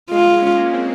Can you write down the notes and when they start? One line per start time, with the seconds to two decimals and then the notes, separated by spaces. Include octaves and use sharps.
0.11 G#3 F4
0.42 C#4
0.57 A#3
0.73 C4